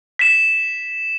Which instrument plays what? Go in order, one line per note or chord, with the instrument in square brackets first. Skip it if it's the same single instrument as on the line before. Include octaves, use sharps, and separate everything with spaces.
[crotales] B6 E7